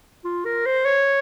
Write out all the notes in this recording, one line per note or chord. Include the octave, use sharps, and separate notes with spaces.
F4
A#4
C5
C#5